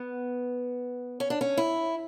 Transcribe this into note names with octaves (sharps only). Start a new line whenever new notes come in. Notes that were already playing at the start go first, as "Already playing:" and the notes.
Already playing: B3
C#4
D4
C#4
E4